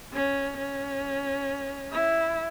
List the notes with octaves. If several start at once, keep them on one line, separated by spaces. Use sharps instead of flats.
C#4
C#4
E4